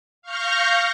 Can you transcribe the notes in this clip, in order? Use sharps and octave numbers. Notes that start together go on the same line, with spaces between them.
F5 C#6 F6 G6 A#6